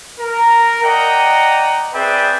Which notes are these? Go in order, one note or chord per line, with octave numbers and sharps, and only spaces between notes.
A#4
D5 D#5 F#5 G5 A#5
C4 G#4 B4 D5 E5 G5